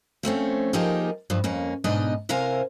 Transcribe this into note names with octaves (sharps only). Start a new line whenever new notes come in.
F3 A3 C4 C#4
F3 A#3 D#4 G4 G#4 A#4
G2 F3
F2 A#3 C#4
G#2 B2 D4 D#4 D#5
C3 E4 A#4 C5 F5 G#5